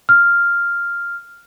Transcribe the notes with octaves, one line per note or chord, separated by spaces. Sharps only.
F6